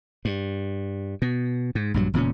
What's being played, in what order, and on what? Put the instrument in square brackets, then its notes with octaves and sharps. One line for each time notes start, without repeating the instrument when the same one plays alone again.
[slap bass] G2
B2
G#2
A#1 G2 F#3
E1 A#2 C#3 C#4